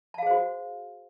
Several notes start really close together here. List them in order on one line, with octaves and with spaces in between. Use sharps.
A5 F5 G#4 C5 F#4